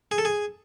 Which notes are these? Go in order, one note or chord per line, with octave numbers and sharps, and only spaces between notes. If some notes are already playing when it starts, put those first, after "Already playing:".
G#4
A4
G#4